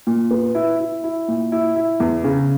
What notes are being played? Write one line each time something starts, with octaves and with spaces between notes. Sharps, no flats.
A#2
B3
E4
E4
E4
A#2
E4
E4
E2
C#3